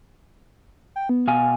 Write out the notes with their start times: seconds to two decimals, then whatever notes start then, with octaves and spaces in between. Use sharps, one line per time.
0.96 G5
1.09 B3
1.28 B2 F5 G#5